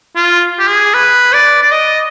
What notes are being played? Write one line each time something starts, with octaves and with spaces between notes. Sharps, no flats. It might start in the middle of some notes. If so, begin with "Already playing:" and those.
F4
G4
G#4
B4
D5
D5
D#5